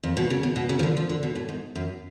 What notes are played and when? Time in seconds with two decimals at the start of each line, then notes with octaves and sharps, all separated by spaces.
0.03 F2
0.17 B2
0.30 C#3
0.43 B2
0.56 B2
0.69 C#3
0.79 F3
0.83 D3
0.97 F3
1.09 D3
1.23 B2
1.35 A2
1.49 G#2
1.75 F#2